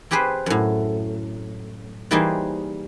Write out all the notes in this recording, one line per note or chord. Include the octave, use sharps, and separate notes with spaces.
C4 G4 G#4 B4 C5
F#2 A2
E3 G3 A#3 D#4 G#4 C5